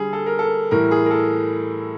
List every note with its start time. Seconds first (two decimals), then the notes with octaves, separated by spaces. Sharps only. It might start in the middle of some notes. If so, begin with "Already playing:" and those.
Already playing: D3 G3 G#4
0.13 A4
0.26 A#4
0.39 A4
0.71 A2 E3 G3 A#4
0.91 G#4
1.06 A#4
1.11 A4